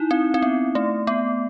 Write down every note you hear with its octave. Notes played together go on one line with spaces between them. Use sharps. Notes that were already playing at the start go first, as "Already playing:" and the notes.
Already playing: D#4 E4
C4
C4
B3
A3
B3